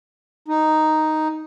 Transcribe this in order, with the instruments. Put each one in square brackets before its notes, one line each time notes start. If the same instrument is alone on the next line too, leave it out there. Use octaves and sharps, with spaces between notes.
[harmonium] D#4